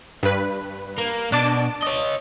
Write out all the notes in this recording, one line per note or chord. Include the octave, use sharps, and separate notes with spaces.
G2 B4
A#3
B2 D4 A5 D6
C#5 D#5